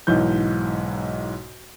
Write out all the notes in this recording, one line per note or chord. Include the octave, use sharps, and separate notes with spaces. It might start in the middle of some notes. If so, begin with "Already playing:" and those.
B1 G#2 E3 G6